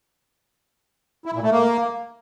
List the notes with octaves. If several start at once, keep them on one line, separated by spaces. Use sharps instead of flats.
E4
A#2
A3
A#3